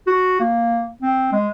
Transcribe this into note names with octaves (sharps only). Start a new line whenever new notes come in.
F#4
A#3
C4
G#3